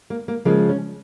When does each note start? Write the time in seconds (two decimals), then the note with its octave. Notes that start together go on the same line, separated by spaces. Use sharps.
0.10 A#3
0.28 A#3
0.45 C#3 F3 G#3 A#3
0.69 C#4